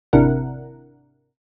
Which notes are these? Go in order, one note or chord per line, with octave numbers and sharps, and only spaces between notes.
G#1 C3 D4 E4 A#4 F#5